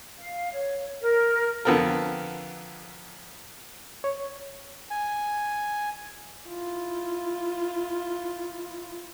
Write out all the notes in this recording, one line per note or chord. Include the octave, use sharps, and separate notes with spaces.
F5
C#5
A#4
F2 D3 B3 A4 A#4
C#5
G#5
E4 F4